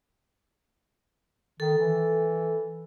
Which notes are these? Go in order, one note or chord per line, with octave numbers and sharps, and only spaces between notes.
D#3 A4
E3